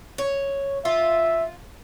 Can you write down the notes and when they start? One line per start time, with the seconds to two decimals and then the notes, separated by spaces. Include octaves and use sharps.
0.18 C#5
0.85 F4 E5